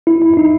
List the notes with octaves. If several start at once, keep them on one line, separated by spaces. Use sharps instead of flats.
E4
E4
E4
D#4